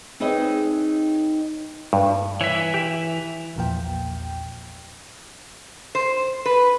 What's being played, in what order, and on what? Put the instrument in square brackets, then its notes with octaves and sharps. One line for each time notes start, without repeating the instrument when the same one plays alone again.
[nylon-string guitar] C4 D#4 G#4 B4 C#5 D#5
[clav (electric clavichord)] G2
[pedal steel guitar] E3 E5 [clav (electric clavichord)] C#5
[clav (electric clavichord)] G4
[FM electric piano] A#1 E2 A#2 F3 G5
[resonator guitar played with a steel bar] C5
B4